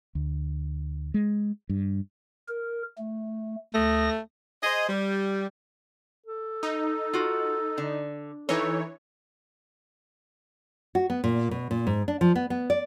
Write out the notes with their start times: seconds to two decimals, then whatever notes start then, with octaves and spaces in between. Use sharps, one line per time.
0.15 D2
1.14 G#3
1.69 G2
2.48 A#4
2.98 A3
3.74 D2 A3 D#6 A#6
4.63 G#4 C5 D#5
4.89 G3
6.27 A4
6.63 D#4
7.13 F4 F#4
7.78 D3
8.49 E3 D#4 A4 C#5
10.95 F#4
11.10 B3
11.24 A#2
11.51 B2
11.71 A#2
11.87 G#2
12.08 D4
12.21 F3
12.35 B3
12.50 B3
12.70 D5